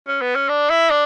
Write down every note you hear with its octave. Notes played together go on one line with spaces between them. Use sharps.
C#4
B3
C#4
D4
E4
D4